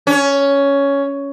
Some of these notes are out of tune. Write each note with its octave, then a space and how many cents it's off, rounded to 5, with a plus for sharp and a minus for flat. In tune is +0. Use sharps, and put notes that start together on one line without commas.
C#4 +10